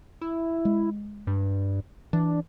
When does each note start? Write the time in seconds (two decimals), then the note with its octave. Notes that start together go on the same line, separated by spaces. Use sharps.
0.21 E4
0.65 G#3
1.27 G2
2.13 E3 D4